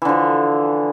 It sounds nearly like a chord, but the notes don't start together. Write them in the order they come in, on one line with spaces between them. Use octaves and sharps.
E3 D3 F3